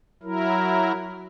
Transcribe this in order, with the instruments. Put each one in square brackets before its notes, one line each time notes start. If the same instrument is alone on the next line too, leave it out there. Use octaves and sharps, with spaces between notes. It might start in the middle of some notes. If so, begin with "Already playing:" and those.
[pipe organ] F#3 E4 A#4